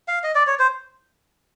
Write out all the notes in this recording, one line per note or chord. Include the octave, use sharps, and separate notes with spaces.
F5
D#5
D5
C#5
C5